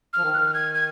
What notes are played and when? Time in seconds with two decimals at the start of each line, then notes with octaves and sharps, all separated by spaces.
0.13 F3 F6
0.23 D#3
0.33 F#6
0.38 F6
0.54 G#6
0.74 G#6